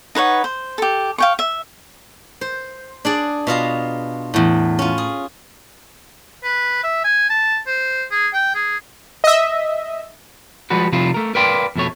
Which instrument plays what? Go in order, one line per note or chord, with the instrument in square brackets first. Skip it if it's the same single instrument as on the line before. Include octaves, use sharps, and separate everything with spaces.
[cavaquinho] D#4 B4 C#5 F#5
C5
G4 A4
F5 G5 C#6
E5
[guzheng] C5
D4 G#4 D5
B2 F4 F5 A#5
E2 A2
C#4 F4
G#4
[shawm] B4
E5
G#5
A5
C5
G#4
G5
G#4
[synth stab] D#5 E5
[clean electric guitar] F3 G3 G#3 F#4 B4
C3 F3 G3 E4 F4
A3 A#4
A#4 B4 D5 F5 G5 C6
F2 B2 A3 C#5